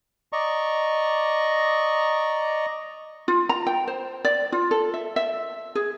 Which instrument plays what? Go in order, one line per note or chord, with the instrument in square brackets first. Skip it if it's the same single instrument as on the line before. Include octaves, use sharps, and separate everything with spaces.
[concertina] D5 D#5 A#5 C#6
[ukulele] F4
A#5
G5
C5
D5
F4
A4
E5
E5
G#4